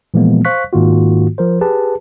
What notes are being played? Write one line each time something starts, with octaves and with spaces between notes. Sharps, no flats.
A#2 E3 F3 G#3 A#3 B3
C5 F5 C#6 F#6 B6
G#2 D#3 A#3 F4 F#4
F3 A#4 C5
G4 G#4 B4 A5